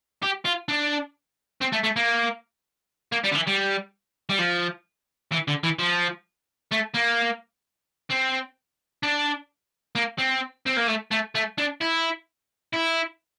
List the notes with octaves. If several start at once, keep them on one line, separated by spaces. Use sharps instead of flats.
G4
F4
D4
C4
A3
A3
A#3
A#3
G3
D3
E3
G3
G3
F3
E3
D3
E3
F3
A3
A#3
C4
D4
A#3
C4
C4
A#3
A3
A3
A3
D4
E4
E4